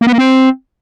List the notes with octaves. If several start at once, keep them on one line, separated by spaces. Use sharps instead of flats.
A#3
B3
A#3
C4